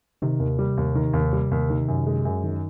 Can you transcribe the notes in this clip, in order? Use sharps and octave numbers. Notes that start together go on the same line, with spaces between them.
C3 D#3
D#2
G3
D#2
D#3
D#2
G3
D#2
D#3
F#2
G#3
F#2
D#3